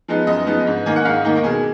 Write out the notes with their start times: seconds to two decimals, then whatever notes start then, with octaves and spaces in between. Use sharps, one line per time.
0.08 F3 G#3 B3 D#4
0.27 F#2 D#5
0.46 F3 G#3 B3 D#4
0.67 G#2
0.86 D#3 A#3 D#4 G#5
0.96 F#5
1.05 G#2 F5
1.25 D#3 A#3 D#4
1.36 A#4
1.44 B2 G#4